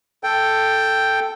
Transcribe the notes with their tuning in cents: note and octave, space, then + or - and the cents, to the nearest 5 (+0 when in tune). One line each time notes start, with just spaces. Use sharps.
A4 +5 G5 +0